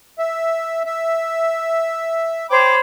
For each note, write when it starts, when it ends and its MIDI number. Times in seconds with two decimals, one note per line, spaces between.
0.19 0.83 76
0.85 2.47 76
2.50 2.79 72
2.50 2.79 73
2.50 2.75 79
2.50 2.79 83
2.50 2.75 86